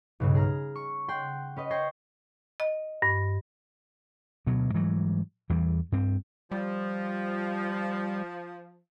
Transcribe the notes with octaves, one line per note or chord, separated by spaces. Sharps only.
B1 G2 C#3
G#4 A#5 F6
C#6
F#5 G5 C6
C#4 B4 D#5
C5 G5 C6 C#6 G#6 A#6
D#5
G2
D2 B2 F#3
G#2 E3 F#3 G3
E2 E3 G3
G2 C4
F3 G3